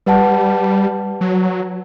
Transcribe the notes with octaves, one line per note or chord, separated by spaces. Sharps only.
G3 B4 D5 F#5 A5
F#3